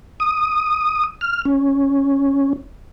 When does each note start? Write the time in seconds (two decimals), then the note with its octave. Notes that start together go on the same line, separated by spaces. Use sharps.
0.20 D#6
1.21 F6
1.45 C#4